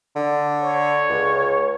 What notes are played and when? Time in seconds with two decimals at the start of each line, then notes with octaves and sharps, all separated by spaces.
0.15 D3
0.62 C#5
1.09 C#2